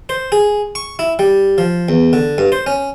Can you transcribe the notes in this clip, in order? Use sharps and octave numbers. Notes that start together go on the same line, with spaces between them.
C5
G#4
C#6
E4
G3
F3
E2
D3
G2
C5
C#4